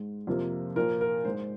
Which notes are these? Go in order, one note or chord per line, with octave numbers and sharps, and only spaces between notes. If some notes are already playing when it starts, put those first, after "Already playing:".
Already playing: G#2 G#3
F2 C3 F3 A#3
A#2 F3 A#3 A#4
A#4
G#2 G#3 C5